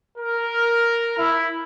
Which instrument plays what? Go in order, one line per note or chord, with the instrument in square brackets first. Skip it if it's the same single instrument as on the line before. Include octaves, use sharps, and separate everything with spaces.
[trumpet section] A#4
E4